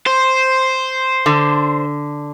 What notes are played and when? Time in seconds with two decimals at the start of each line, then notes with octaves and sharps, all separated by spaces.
0.07 C5
1.26 D3